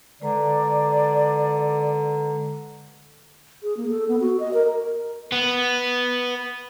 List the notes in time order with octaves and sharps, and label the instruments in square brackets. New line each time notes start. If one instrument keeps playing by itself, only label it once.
[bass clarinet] D3 [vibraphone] G#3 B4 A#5 [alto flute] D5
[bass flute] G#4
A#3
A4
B3
F#4
D#5
A#4
[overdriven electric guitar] B3